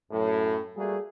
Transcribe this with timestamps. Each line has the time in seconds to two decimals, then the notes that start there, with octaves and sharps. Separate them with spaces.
0.12 F#2 A2
0.77 G3 A3 A#3 F#4 G#4 D5